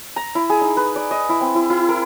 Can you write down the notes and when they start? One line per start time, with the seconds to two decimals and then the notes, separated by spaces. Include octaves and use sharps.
0.16 A#5
0.35 E4
0.50 G#4
0.61 D#4
0.77 B4
0.96 D5
1.11 D#5
1.29 E4
1.41 C4
1.55 E4
1.70 E4
1.89 A#4